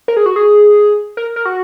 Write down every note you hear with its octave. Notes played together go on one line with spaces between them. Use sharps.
A#4
G#4
F#4
G#4
A#4
A#4
F#4